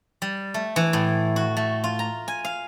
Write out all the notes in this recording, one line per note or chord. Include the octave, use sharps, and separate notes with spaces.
G3
A3
E3
A2
F#4
A3
F4
A#5
G#5
F5